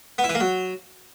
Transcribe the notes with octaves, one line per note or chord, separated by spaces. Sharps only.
B3
E4
E3
A#3
F#3